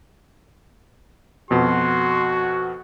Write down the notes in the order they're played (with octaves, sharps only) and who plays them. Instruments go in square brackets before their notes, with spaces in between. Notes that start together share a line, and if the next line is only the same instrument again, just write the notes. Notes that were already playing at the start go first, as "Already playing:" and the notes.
[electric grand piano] F2 B2 [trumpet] F#4 [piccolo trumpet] C6